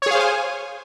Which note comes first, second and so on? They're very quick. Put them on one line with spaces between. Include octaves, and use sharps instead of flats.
C#5 G#4 F5 C5 G#5